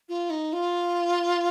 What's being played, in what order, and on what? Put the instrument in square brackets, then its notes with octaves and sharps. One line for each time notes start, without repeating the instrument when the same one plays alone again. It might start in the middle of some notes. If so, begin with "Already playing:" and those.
[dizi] F4
D#4
F4